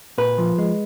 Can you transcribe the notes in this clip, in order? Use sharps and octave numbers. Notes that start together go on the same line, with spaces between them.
A#2 B4
F3
G#3